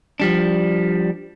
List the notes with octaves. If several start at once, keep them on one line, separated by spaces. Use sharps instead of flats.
F3 G3 D4